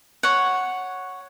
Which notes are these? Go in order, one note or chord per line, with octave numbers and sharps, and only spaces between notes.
C#5 F#5